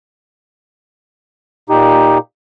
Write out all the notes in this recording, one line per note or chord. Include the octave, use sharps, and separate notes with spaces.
A#2 D#4 G4